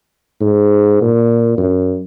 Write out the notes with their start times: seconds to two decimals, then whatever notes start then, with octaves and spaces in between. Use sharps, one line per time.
0.41 G#2
1.02 A#2
1.58 F#2